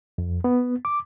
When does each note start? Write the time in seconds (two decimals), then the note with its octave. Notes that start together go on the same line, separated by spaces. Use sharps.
0.18 F2
0.44 B3
0.85 D6